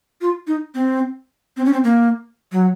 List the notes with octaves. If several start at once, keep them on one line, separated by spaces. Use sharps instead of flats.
F4
D#4
C4
C4
C#4
C4
A#3
F#3